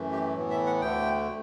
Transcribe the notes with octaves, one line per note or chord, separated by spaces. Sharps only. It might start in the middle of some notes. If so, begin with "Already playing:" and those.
Already playing: F#2 E3 A3
G4
A2 E3 B3
E5
F#5
D2 D3 A3 G5